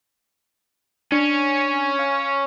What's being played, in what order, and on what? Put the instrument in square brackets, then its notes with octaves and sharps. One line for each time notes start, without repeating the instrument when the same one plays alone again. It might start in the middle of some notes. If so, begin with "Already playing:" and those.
[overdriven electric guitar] C#4 [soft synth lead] D4
[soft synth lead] F5